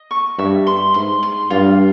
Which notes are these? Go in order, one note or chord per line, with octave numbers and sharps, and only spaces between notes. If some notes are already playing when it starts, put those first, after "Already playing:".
Already playing: D#5
C#6
G2 E5
C6
G#2 C6
C6
G2 F4